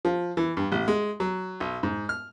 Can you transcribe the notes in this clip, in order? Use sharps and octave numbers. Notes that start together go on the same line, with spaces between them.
F3
E3
G2
A1
G#3
F#3
B1
G#2
F6